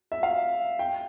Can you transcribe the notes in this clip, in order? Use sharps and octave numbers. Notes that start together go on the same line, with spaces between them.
E5
F5
G5